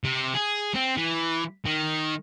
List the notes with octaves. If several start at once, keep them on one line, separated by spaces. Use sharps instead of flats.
C3
G#4
C4
E3
D#3